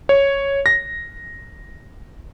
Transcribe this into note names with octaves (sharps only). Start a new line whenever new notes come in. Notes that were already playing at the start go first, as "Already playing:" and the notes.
C#5
A#6